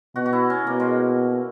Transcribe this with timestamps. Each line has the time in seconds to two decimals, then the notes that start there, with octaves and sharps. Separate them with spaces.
0.15 B2 F#4
0.26 F#4
0.33 E4
0.50 C#4
0.67 B2 A#3
0.80 G#3